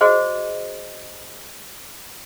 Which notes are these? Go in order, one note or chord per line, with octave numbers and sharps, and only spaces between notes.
F#4 G#4 C5 D#5